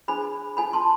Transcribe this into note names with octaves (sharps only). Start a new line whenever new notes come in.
D4 G#4 C5 G#5 B5
F4 A4 C5 G#5 B5
A5 C6